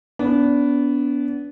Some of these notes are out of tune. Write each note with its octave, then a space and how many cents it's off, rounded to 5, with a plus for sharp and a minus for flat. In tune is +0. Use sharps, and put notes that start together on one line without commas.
B3 +0 D4 -35